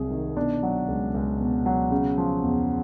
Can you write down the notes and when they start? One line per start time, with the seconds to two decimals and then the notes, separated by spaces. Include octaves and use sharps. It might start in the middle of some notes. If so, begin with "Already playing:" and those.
Already playing: C2 C3 F#3 G#4
0.11 D#3
0.36 B2 D4
0.63 F#3
0.88 C#2
1.14 C#2
1.41 B2
1.66 F#3
1.91 C#3
2.18 F3
2.43 E2